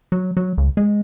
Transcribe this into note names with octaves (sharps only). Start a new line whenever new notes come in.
F#3
F#3
C#2
G#3